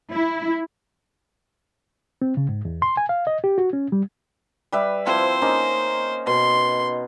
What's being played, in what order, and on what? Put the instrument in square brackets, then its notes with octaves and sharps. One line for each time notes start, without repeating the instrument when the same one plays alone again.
[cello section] E4
[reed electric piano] C4
C#3
G#2
E2
C6
G#5
F5
D#5
G4
F#4
C#4
G3
[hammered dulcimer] G3 B4 E5
[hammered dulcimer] F3 C4 E4 [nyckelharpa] C5
[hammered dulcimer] A#3 C#4 D#4
[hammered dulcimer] B2 [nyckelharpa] C6